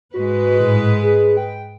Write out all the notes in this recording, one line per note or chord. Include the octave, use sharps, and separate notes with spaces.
G#2 G#3 F#4 B4
A2
G#4
G5